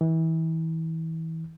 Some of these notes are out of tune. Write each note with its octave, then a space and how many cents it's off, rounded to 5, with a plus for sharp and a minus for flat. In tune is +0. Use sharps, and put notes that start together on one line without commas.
E3 -30